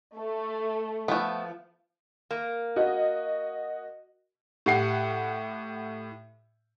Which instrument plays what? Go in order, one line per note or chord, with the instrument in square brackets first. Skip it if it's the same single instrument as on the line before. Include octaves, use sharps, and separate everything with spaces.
[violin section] A3
[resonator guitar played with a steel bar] F3 [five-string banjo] A3 B3
[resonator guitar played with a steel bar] A#3
[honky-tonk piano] F#4 D#5
A2 G4 F#5 C7